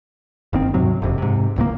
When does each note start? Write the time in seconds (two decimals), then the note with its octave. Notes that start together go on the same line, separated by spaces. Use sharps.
0.53 F#1 D#3 C4
0.74 D#2 G#2 C3 F#3
1.02 F#1 F2 C3
1.18 G#2 C3
1.56 D1 C#2 C#3 A#3